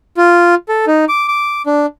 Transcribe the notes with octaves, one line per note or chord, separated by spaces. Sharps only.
F4
A4
D#4
D6
D6
D4